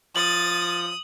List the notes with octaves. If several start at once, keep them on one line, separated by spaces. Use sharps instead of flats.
F3 D#6 A6 F#7